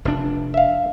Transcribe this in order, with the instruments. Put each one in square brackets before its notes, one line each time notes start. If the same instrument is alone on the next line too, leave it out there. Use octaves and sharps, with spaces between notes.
[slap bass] F1 A2 D4
[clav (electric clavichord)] E5 F5